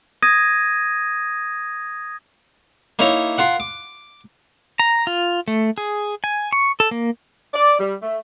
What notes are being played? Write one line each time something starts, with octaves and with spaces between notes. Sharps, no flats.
D#6 G#6 A#6 D#7
A#3 D#4 E4 A#4 C#5 A#5
F4 A#4 F#5
D6
A#5
F4
A3
G#4
G#5
C#6
A4
A#3
D5
G3
A3